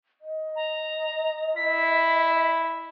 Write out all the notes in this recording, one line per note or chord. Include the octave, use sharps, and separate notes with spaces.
D#5
A#5
E4 B6